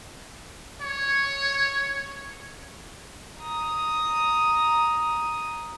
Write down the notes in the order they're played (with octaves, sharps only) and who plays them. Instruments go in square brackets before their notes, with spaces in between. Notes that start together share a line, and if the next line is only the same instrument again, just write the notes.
[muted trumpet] C#5
[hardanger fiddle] A#5 D#6